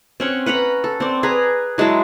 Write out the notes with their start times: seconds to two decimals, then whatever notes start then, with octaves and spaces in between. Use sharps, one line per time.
0.20 C4 C#4 F#5
0.46 B4 F#5 A#5 B5
0.84 A4
1.00 C4 D5
1.23 G#4 B4 A#5
1.78 F#3 G#3 E4 A5